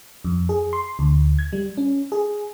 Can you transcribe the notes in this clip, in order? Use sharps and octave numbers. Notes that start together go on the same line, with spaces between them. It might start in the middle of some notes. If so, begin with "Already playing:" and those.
F2
G#4
C6
D2
G#6
G3
C#4
G#4